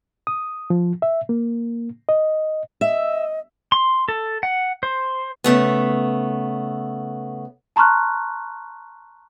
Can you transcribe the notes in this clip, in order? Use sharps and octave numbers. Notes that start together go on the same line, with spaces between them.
D#6
F3
E5
A#3
D#5
D#5 E5
C6
A4
F#5
C5
C#3 A3 B3
A5 A#5 C6 C#6 F6 F#6